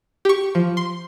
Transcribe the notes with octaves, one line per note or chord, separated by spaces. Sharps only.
G4 C#6
F3
C6